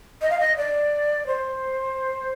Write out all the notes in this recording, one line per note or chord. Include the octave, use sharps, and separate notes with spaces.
D#5
F5
D#5
D5
C5